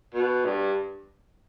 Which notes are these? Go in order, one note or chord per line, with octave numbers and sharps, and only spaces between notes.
B2
G2